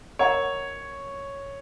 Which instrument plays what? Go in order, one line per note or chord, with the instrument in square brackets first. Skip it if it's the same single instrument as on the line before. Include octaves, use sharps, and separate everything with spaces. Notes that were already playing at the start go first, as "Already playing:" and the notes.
[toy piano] A#4 D#5 F#5 A#5 [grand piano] C#5